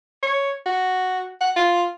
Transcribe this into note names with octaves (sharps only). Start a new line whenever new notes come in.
C#5
F#4
F#5
F4